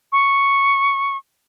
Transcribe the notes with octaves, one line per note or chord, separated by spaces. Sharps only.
C#6